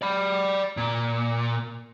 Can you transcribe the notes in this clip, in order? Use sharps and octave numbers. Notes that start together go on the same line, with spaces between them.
D5 B5
A#2